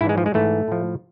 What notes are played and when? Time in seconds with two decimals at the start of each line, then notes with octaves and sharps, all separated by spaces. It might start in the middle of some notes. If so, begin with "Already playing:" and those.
0.01 G#2 E4
0.04 E3
0.09 G#3
0.18 F3
0.26 G#3
0.34 G#2 E3 A3
0.68 A2 F3